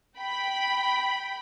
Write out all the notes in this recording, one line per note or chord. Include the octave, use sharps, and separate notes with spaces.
G5 B5